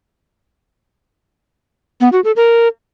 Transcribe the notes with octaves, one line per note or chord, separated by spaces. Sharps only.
B3
F#4
A4
A#4